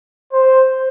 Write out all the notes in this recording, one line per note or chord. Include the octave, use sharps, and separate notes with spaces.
C5